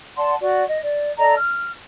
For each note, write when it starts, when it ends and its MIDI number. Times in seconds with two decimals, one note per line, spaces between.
0.17 0.34 74
0.17 0.34 78
0.17 0.34 81
0.17 0.34 84
0.40 0.63 66
0.40 0.63 74
0.66 0.78 75
0.83 1.11 74
1.18 1.34 69
1.18 1.34 74
1.18 1.34 75
1.18 1.34 82
1.37 1.71 89